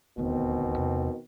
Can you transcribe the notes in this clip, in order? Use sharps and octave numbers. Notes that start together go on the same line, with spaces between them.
D#1 D2 B2 D#3 B3 C4
E2 C3